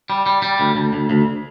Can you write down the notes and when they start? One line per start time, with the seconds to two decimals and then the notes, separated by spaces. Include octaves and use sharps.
0.10 G3
0.26 G3
0.42 G3
0.60 D2
0.76 D2
0.93 D2
1.10 D2